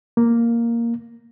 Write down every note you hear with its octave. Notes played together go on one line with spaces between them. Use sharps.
A#3